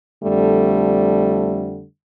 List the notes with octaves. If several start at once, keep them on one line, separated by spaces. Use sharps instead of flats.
F2 D3 G3 A3